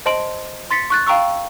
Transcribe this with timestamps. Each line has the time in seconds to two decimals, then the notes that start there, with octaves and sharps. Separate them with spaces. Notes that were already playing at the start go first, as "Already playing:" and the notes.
0.06 C5 D#5 A5 C6 D7 F#7
0.71 C6 A6 B6 C#7
0.90 C#6 F#6 A6
1.07 F5 G5 A#5 C#6 E6